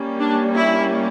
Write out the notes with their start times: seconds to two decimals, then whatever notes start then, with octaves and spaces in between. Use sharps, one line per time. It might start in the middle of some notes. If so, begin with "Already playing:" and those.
Already playing: G3 A#3 C#4
0.19 D4
0.57 E4